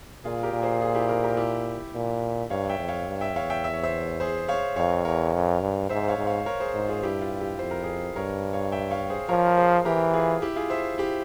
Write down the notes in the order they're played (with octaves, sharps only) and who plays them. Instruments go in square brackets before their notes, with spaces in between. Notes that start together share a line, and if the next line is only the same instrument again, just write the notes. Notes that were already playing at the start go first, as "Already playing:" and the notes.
[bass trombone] A#2 [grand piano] F4 G#4
[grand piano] G4 A#4
[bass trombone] A#2
[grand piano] G#4 C5
F4 G#4
E4 G4
G4 A#4
G4 A#4
E4 G4
[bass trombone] A#2
[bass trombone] G2 [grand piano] C#5 F5
[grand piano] E5 G5
[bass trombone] F2
[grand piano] C#5 F5
[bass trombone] G2
[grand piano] E5 G5
[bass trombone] E2 [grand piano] C#5 F5
[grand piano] E5 G5
E5
C#5
C5 E5
G#4 C5
C#5 F5
[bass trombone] F2 [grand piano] C#5 F5
[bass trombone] E2 [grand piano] A#4 C#5
[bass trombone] F2
G2
[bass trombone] G#2 [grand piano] C5 E5
[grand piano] C#5 F5
[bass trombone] G#2
[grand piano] C#5 F5
A#4 C#5
G#4 C5
[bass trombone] G#2
[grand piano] F4 G#4
[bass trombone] G2 [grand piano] E4 G4
[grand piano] F4
E4 G4
[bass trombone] F2 [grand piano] C5
[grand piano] A#4
G#4 C5
[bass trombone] G2 [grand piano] A#4 C#5
[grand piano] C#5 F5
E5 G5
C#5 F5
G#4 C5
[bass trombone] F3 [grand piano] A#4 C#5
[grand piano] A#4
G#4 C5
[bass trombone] E3 [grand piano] G4 A#4
[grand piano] F4 G#4
E4 G4
F4 G#4
C5 E5
E4 G4